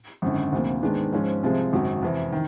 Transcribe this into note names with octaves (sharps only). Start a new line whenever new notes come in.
G#1 F#2 D3
D2 C3 F3 A#3
G#2 D#3 G#3 B3 D4
G#2 F3 G#3 C#4
C2 C3 F3 G#3
G#1 F#2 C#3 F#3
F2 C3 E3
D#3